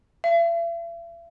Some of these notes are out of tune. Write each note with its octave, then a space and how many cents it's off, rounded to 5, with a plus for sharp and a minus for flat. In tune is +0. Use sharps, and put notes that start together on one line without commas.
E5 +45